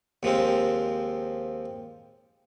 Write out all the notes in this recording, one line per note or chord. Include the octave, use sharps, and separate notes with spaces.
D#2 F3 G#3 C4